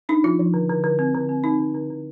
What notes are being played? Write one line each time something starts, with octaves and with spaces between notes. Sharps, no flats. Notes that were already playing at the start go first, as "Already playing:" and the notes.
D4 D#4
F3 F4
F3
D3
D3
D3
C4
D3
C4
C4 D#4
D3
D3
D3